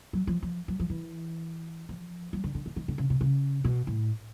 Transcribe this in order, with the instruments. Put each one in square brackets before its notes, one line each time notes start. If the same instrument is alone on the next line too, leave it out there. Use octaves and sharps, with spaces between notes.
[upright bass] F#3
F3
F3
F#3
F3
E3
F3
F#3
D3
D3
D#3
D#3
D3
C#3
C3
C#3
B2
A2